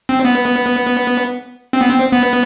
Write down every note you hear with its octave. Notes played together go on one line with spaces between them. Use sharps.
C4
B3
C4
B3
C4
B3